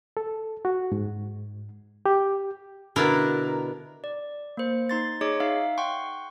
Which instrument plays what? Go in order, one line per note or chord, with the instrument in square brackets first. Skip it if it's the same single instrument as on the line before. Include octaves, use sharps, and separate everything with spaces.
[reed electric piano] A4
F#4
G#2
G4
[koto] B2 D3 D4 E4 A#4
[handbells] D5
A#3 C5
D#4 C6 A6
D#4 G#4 C#5 D#5 D6
D#4 E5 F5
F#5 G5 C6 C#6